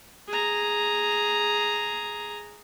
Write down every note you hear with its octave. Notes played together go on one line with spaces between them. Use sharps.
G#4 A#5